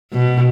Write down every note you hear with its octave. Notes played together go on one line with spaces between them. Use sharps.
B2